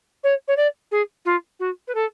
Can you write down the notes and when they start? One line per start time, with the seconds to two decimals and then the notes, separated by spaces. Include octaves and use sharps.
0.24 C#5
0.48 C#5
0.57 D5
0.91 G#4
1.25 F4
1.60 F#4
1.88 B4
1.95 A4